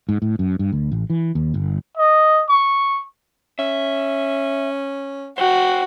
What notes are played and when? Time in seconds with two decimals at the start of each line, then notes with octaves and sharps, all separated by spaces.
0.09 G#2
0.22 A2
0.39 F#2
0.59 G2
0.72 D2
0.92 A1
1.10 E3
1.35 D#2
1.54 G1
1.97 D#5
2.49 C#6
3.59 C#4 E5
5.38 F#4 C5 F#5 G5